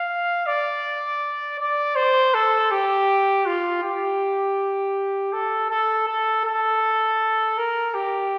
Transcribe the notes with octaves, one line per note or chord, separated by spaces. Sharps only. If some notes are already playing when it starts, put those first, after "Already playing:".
Already playing: F5
D5
D5
C5
A4
G4
F4
G4
A4
A4
A4
A4
A#4
G4